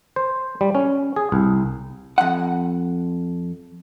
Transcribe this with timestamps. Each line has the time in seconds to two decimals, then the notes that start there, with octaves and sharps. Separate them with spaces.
0.16 C5
0.61 G3
0.75 C#4
1.16 G#4
1.32 C2
2.18 F2 F#5